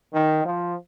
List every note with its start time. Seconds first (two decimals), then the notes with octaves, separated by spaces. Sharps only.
0.13 D#3
0.45 F3